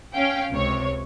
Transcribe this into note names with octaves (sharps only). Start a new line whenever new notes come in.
C#4 F5 G5
C#2 C3 C#5